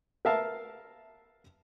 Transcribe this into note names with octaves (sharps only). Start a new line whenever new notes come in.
A#4 B4 E5 F5 A5